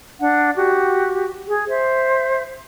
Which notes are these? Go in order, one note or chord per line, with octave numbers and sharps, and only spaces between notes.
D4 F#5
F#4 G4
G#4
C5 E5